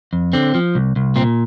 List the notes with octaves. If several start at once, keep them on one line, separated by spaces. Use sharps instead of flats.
F2
D3 C4
F3
C2
C2
A#2 C4